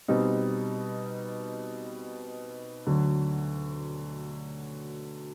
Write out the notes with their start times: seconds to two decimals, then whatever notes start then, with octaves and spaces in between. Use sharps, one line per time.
0.08 B2 G3 C4 D#4
2.87 D2 D3 F#3